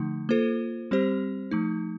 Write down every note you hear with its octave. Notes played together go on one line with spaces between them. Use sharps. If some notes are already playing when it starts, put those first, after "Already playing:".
Already playing: D3 F3 A3 D#4
A#3 F4 A4 C5
G3 C4 G4 C5
F3 A3 D#4